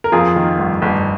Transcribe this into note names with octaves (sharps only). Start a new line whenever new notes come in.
A#4
F2 F4 G#4
D#3
G1
G1